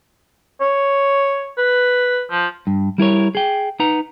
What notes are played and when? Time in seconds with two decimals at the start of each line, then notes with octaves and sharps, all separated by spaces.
0.61 C#5
1.58 B4
2.31 F3
2.67 G2
2.98 G3 E4 A#4 C#5
3.35 G#4 G5
3.80 D#4 B4 F#5 A#5